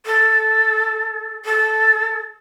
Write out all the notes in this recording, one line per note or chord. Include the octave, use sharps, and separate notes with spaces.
A4
A4